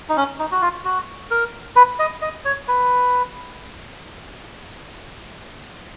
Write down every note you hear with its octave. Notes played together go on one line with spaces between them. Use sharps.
D#4
C#4
D#4
F#4
F4
F#4
A#4
B4
D#5
D#5
C#5
B4